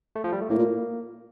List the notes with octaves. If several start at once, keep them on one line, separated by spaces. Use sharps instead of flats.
A3
F3
G3
A3
A2 A#3
A#2